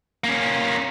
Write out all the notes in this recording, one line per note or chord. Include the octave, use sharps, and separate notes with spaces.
A#3 C#4